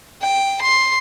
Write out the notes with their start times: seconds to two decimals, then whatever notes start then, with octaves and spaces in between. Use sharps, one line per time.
0.22 G5
0.61 C6